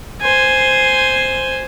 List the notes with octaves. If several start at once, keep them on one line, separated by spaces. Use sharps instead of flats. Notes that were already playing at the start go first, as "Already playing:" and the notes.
C5 G#5